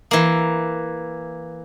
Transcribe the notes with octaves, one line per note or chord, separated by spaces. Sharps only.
E3 A#3